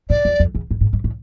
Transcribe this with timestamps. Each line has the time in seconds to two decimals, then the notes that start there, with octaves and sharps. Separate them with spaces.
0.10 A2 D5
0.25 F2
0.40 F2
0.55 E2
0.71 A2
0.81 G#2
0.93 G#2
1.04 A2